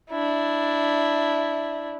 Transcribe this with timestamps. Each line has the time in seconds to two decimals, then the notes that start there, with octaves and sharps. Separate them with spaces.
0.10 D4 E4